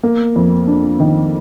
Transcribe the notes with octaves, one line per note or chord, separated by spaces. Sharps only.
A#3
F2
D4
D#3